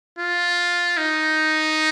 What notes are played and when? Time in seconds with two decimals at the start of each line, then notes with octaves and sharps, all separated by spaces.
0.19 F4
0.98 D#4